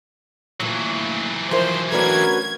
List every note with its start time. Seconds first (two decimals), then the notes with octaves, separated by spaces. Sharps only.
0.60 D2 A#2 E3 F#3
1.51 F3 E4 A#4 C5
1.92 A3 C#4 D4 F#4 A#4 B4 G#6